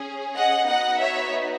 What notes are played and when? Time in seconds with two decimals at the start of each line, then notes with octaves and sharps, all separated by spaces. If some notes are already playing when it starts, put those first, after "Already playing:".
Already playing: C#4 G#4
0.36 D#5 F#5
0.67 B3 D#4 F#4 D#5 F#5
1.00 C#5 E5